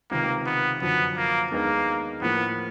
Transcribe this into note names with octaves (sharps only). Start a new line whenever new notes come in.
C#2 C3 D#3 A#3
B3
F#2 D3 F3 B3
A#3
D#2 D#3 G#3 A#3 B3 D4
A2 F3 A#3 B3